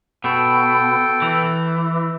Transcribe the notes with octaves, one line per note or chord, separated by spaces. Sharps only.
B2 A4 G5
E3